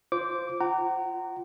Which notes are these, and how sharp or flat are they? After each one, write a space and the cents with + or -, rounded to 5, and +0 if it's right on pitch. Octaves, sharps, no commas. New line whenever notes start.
F4 +0 C5 +0 D6 -15
F4 +0 F#5 +35 A#5 -20